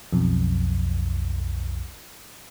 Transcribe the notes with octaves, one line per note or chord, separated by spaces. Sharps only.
B1 F2